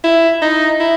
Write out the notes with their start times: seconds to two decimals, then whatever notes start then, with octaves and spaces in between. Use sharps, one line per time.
0.04 E4
0.42 D#4
0.80 E4